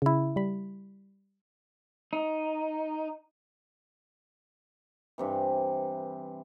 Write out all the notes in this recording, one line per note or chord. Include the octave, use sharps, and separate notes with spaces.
C#3 E4
G3 B5
D#4
G2 C3 E3